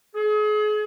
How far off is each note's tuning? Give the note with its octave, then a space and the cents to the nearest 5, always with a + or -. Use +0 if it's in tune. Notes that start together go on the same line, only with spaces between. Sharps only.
G#4 +35